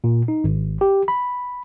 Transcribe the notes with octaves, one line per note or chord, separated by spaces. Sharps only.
A#2
D#4
G#1
G4
B5